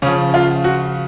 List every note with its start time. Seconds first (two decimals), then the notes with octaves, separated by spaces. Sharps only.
0.02 C#3 F3 C#4
0.34 F4
0.64 F#4